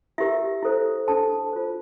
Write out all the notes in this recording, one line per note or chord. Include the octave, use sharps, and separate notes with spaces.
E4 G4 A#4 E5
E4 A4 C5
D4 A4 C5 A5
F4 C5